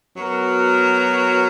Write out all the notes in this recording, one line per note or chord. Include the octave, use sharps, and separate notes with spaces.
F#3 B3 F#4 A#4